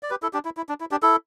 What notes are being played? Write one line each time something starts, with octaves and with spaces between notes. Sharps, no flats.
D5
G4 B4
E4 A4
D4 G4
E4
E4
D4
E4
D4 G4
E4 A4